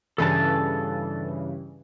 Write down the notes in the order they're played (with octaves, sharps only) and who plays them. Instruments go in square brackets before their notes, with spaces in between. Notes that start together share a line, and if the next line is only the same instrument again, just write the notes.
[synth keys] G2 C#3 E3 [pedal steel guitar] A4 A5